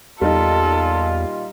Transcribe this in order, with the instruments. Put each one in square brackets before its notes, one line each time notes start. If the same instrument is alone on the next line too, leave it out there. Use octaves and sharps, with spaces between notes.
[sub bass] E2 [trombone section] A#2 F4 [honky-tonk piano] G3 D#4 [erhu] A4